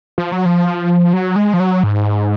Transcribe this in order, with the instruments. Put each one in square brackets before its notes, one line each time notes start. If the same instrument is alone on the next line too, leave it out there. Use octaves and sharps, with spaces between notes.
[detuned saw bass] F3
F#3
F3
F#3
G#3
F3
F#3
G#2